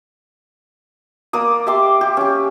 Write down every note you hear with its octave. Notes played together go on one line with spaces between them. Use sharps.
A#3 D5 D#6
G4 E5 C6 D6
G4
C#4 G4